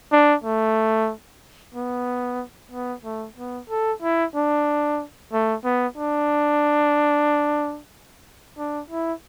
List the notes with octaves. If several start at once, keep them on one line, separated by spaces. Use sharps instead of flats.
D4
A3
B3
B3
A3
B3
A4
E4
D4
A3
B3
D4
D4
E4